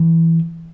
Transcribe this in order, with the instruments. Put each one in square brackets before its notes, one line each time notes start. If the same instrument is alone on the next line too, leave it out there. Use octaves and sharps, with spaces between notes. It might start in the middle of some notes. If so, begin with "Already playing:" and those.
Already playing: [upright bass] E3